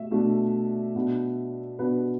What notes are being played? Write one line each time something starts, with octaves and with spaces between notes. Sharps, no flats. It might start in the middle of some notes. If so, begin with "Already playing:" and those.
Already playing: B2 A3 E5
B2 A3 D4
B2 B3 D4
B2 B3 D4 B4